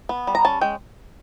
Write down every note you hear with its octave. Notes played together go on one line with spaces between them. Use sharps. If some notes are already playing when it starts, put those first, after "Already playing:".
B3
G3
A#5
C#4 A5
G#3 G5